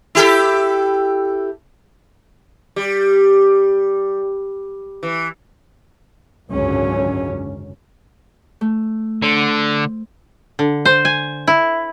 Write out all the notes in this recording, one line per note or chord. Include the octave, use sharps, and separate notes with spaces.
E4 G4 A4
G3
E3
G#1 C#2 F#2 D3 F#3 C#4
A3
D3 C5
D3
C5
G#5
E4